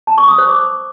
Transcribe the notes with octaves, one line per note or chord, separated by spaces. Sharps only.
A5
C#6
D#6
C5
D6